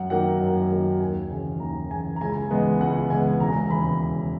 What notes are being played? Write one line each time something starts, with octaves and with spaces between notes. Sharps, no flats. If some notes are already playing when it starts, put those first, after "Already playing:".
Already playing: F#2 F#5
D#3 F#3 A#3 F#5
F#2
D#3 F#3 A#3
D#2 G#5
C#3 E3
D#2 A#5
C#3 E3 G#5
A#5
C#2 G#5
C#3 E3 G#3 B3
C#2 F#5
C#3 E3 G#3 B3 G#5
E1 A#5
D#2 C#3 E3 B5